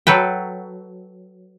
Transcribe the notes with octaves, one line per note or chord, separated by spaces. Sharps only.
F#3 A4 B4 G5